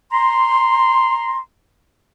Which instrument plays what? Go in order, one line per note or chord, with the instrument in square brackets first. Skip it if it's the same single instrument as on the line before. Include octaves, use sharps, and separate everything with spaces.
[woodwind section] A#5 C6